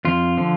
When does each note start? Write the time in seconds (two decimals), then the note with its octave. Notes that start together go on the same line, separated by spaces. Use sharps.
0.05 F2 F4
0.37 D3 F3